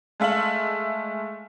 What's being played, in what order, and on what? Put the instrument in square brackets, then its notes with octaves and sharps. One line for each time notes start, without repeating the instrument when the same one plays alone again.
[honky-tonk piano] G#3 A3 E5 F5 F#7